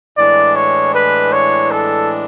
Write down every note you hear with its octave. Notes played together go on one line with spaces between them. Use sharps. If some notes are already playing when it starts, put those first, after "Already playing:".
A2 E3 G#3 D4 D5
C#5
B4
C#5
A4